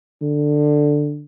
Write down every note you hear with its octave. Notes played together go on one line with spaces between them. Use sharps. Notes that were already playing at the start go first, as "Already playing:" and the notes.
D3